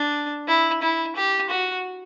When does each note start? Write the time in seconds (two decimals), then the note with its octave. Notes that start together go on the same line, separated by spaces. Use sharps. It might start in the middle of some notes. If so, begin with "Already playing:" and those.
Already playing: D4
0.48 E4
0.82 E4
1.16 G4
1.49 F#4